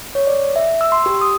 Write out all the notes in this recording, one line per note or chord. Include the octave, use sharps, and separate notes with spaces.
C#5
D5
E5
E6
C6
G4
D#6